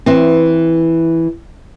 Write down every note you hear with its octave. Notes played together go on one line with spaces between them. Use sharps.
E3 C4